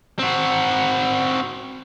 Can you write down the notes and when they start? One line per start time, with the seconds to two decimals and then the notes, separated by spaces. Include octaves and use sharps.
0.19 C4 F#4